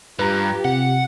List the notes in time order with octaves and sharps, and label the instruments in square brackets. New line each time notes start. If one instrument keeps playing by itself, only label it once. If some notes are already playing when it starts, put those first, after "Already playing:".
[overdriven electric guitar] G2 [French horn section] F4 G4 [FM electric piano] B4 A#5
[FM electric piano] C3 [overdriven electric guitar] F#5